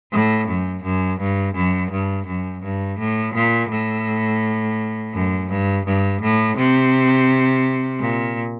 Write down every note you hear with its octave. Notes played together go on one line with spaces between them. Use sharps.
A2
F#2
F#2
G2
F#2
G2
F#2
G2
A2
A#2
A2
F#2
G2
G2
A2
C3
A#2